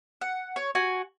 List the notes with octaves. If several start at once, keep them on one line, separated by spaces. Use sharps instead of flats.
F#5
C#5
F#4 G#5